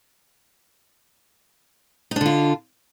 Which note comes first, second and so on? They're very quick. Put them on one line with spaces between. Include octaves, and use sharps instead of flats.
D#4 D4 D3 F4